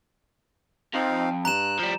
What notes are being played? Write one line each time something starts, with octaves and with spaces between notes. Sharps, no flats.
F2 C4 D#4 F5
G2 A#5 F#6 E7
F3 G3